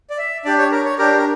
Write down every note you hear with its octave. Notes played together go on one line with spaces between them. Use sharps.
D5
E5
D4 G4 D5
C#5
A#4
C#5
D4 G4 A#4
A#4